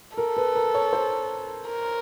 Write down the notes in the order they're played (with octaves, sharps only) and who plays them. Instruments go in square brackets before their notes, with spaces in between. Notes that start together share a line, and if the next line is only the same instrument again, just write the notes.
[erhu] A4 [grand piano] A#4
[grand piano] B4
A#4
C#5
C5
[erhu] A#4